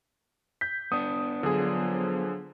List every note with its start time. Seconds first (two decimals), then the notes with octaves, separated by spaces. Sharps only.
0.61 G6 B6
0.92 B3 D4 D#6
1.43 D3 F3 F#3 G#4